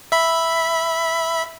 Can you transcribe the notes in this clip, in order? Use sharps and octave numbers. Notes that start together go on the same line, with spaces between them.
E5 B5